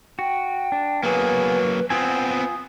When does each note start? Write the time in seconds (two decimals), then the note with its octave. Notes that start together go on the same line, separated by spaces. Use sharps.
0.19 F#4 G5
0.72 D4
1.03 F#3 A#3 B3 G#4 B4
1.90 B3 C4 F4 G#5 D#6